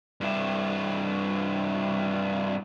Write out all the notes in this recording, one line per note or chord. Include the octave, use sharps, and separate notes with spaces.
G2 E4